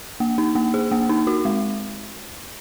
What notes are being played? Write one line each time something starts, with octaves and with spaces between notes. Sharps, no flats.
A#3
D#4
A#3
G#4
A#3
D#4
F#4
G#3